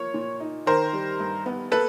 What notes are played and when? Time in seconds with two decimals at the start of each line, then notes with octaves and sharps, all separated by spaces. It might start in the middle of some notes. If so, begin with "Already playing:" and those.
Already playing: F3 A#3 C#5
0.14 A#2
0.40 D#4
0.66 D#3 A#4 C5
0.93 G3
1.20 G2
1.46 B3
1.72 A#3 A4 B4